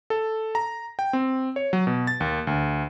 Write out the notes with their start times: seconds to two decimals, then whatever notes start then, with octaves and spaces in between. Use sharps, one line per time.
0.10 A4
0.55 A#5
0.99 G5
1.13 C4
1.56 C#5
1.73 F#3
1.87 B2
2.07 A6
2.20 D#2
2.47 D2